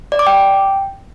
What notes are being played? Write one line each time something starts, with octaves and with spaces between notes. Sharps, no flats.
D5
D6
G5